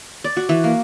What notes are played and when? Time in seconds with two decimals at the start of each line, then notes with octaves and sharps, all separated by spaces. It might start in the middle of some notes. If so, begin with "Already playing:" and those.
0.24 D5
0.37 F#4
0.49 E3
0.64 A#3